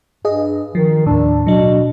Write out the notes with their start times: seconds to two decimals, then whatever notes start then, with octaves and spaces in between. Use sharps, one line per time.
0.25 G2 G#4 D#5
0.75 D#3 F3
1.06 D#2 A2 D4
1.47 B2 F#3 D4